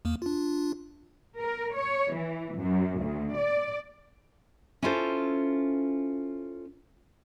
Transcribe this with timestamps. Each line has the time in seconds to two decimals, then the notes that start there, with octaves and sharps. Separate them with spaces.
0.05 E2 A#3
0.22 D4 F4
1.39 A#4
1.74 C#5
2.14 E3
2.57 F#2
3.01 D2
3.38 D5
4.82 C#4 E4 F4 A4 C5